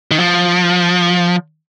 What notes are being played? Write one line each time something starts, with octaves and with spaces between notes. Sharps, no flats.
D#3
F3